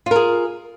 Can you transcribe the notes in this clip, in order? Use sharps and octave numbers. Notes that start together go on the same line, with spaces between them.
F4 G#4 A#4